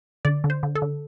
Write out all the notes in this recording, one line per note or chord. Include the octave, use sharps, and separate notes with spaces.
D3 D5
D3
C5
D3
A4
D3